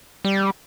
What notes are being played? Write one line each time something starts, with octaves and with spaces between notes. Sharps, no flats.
G3